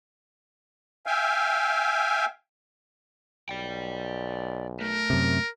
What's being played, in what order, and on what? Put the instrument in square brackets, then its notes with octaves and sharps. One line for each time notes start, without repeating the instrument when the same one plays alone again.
[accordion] E5 F5 G5 G#5
[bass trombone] B1 [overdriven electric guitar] D5 G5
[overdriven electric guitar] A3 [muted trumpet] A#4
[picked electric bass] F#2 C3